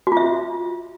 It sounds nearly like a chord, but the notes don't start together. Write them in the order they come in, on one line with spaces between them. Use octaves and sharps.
F#4 F4 E5